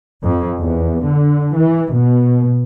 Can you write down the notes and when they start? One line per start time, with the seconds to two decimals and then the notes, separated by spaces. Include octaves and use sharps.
0.23 F2
0.59 E2
1.07 D3
1.56 E3
1.93 B2